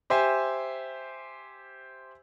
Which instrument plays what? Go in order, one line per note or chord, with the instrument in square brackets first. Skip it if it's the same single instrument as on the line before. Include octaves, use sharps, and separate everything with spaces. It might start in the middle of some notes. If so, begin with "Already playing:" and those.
[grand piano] G4 C5 E5 G#5